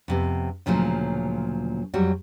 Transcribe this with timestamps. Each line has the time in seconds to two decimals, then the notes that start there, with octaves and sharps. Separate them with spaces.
0.08 F2 C3 B3
0.66 D2 A#2 C#3 F3 F#3
1.94 F2 F#3 G3 F#4